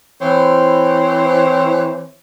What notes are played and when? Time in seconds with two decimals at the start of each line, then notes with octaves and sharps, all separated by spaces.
0.21 E3 C4 E4 C5 C#5